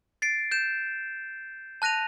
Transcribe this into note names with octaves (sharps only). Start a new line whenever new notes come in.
A6 C7 D7
G6 E7
A5 F#6 A#6 D#7 F7